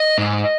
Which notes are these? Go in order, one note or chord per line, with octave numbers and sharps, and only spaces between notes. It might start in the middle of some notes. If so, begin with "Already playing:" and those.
Already playing: D#5
G#2